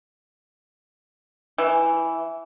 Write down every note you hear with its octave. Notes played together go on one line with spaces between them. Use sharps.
E3